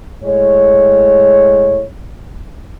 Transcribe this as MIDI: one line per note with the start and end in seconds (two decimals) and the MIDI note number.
0.24 1.82 45
0.24 1.82 56
0.24 1.82 73